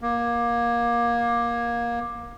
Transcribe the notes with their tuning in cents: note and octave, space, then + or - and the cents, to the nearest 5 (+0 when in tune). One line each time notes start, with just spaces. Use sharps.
A#3 +20